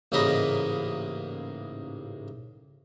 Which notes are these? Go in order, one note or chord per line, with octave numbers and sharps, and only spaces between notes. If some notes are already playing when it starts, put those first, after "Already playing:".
A1 G#2 C#3 A#3 D#5 B5